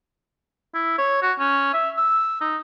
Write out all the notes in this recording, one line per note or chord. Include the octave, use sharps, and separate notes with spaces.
E4
C#5
F#4
C#4
E5
E6
D#4